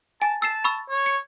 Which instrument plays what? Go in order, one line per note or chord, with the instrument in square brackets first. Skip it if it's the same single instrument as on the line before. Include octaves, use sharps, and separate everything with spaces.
[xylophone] G#5 [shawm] A5
[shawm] A5 [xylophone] E6 C7 E7
[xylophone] B5 C#6 E6
[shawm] C#5
[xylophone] C#7